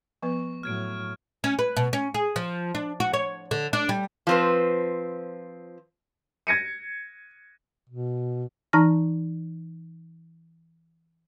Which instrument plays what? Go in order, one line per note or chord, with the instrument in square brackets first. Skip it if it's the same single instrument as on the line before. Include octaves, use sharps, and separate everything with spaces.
[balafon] F3 B3 B4 [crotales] C#6
[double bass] A2 F#3 [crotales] F6 G#6 D7
[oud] C#4
B4
B2
C#4
G#4
F3
D4
F#4
C#5
D3
D4
G3
[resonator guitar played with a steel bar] F3 C4 B4
[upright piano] G#6 A#6 C#7 D#7
[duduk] B2
[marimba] E3 D#4 A5 A#5 F6 A#6